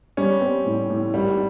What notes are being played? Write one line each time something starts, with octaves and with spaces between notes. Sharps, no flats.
G3 C#4
C4
A2
A2
G#1 G3